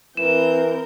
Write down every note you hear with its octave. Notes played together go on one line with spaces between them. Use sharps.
E3 C4 A#4 G6 E7